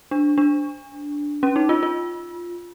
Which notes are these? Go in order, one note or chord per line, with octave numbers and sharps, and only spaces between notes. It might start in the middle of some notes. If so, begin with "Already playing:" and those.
D4
D4
C#4
D#4
F4
F4